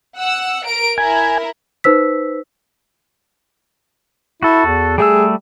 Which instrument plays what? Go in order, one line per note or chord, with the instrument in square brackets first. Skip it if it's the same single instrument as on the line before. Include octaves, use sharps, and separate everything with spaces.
[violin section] F#5 E6
A#4 D7
[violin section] E4 A#4 [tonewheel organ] G#5
[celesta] D#4 B4 C5 E6 B6
[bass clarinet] E4 [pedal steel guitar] F#4 A4
[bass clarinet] E2
[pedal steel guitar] G3 A3 E6 [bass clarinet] G#4